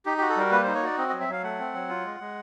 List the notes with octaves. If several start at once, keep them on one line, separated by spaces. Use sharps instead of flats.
D#4 G4
F#4 G4
A4
G3 A#4
A#3 B4
D#4 C5
C#5
F#4 D5
C4 D#5
F#3 D#5
E5
F#3 F5
A3 F#5
C4
F#3
F4
G#3
G#3